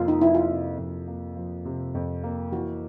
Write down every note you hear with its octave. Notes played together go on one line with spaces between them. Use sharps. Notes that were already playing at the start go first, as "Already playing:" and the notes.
Already playing: F2 C3 F3 A#3 F4
D#4
F3 E4
F4
C3
F2
A#3
F3
C3
F2
A#3
E3 F#4